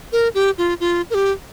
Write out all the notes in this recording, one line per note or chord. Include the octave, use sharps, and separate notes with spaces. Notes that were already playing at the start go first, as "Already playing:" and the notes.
A#4
G4
F4
F4
A#4
G4